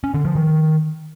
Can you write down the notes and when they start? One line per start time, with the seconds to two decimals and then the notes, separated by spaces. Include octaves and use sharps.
0.04 C#4
0.14 D3
0.25 F3
0.35 D#3